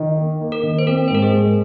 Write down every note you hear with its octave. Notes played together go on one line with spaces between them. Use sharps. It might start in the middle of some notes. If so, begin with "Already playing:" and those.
Already playing: D#3
A#3
A#3
A#4
D#3
C5
C4 A#4
C5
G#2 A#4
G#4
G#3